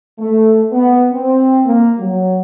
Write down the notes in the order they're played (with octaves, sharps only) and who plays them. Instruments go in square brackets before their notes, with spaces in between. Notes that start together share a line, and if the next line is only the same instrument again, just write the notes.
[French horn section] A3
B3
C4
A#3
F#3